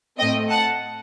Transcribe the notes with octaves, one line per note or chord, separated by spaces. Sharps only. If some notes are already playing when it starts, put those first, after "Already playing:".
A2 A3 C4 D#5 G5
F#5 A5